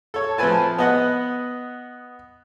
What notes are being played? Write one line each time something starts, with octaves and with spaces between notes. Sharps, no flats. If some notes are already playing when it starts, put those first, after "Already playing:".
A4 C#5
F3 A3 C4 B4 G#5 A5
B3 D#5 F#5